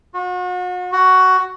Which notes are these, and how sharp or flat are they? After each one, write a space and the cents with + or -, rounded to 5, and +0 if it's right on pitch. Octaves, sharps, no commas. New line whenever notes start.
F#4 -40
F#4 +10